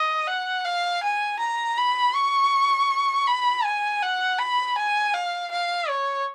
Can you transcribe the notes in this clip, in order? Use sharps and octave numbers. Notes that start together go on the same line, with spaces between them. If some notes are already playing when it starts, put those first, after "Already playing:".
Already playing: D#5
F#5
F5
G#5
A#5
B5
C#6
B5
G#5
F#5
B5
G#5
F5
F5
C#5